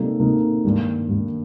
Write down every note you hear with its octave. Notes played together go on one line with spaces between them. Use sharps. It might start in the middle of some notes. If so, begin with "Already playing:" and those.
Already playing: C3 G3 A#3 D#4 A4
C3 G3 A#3 D#4 A4
G2 D#3 G3 A#3
G2 D#3 G3 A#3